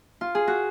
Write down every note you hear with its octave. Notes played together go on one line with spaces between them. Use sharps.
F4
G#4
F#4